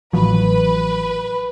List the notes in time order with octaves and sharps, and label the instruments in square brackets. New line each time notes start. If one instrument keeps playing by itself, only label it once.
[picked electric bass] A1 F3 F#3 [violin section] B4